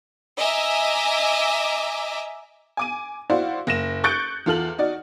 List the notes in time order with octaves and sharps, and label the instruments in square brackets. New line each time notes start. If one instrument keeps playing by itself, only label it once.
[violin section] D#5 E5 G#5 A#5 D6
[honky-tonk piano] G#5 D6 D#7
E4 F#4 C5 D5 F5
F#1 A#6 E7
C#6 F#6 G6 A6 C#7 D7
E2 F4 A4 F6 F#7
D#4 F#4 D5